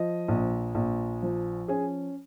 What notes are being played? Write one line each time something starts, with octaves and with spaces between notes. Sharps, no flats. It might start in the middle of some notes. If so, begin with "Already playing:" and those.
Already playing: F3 D#5
A#1
A#1
F3
C#4 G#4 G#5